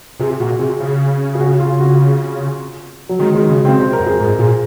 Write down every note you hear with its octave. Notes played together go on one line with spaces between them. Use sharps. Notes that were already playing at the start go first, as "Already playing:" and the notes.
C3 G#4
A#2 F#4
C3 G#4
C#3
G#4
F#4
F4
F#4
F#3
D#3 G#3
D#3 G#3
C#3
C#3 C4
C3 C5
A#4
F#2
G#4
G#2 A#4
A#2 G#4